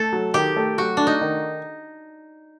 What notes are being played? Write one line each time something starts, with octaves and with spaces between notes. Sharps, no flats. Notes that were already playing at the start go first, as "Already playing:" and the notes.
Already playing: A3 A4
F#3
D#3 G4
A3
F#3 F#4
A3 D4
D#4
D#3